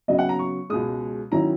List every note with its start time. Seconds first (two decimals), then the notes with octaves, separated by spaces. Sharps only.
0.08 C#3 F#3 B3 D#5
0.19 F#5
0.29 A#5
0.39 C#6
0.70 C#2 B2 G#3 D#6
1.32 D#3 F#3 C#4 E4 A#5